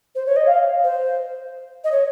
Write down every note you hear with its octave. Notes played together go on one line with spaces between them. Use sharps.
C5
C#5
D#5
F5
C5
D#5
C#5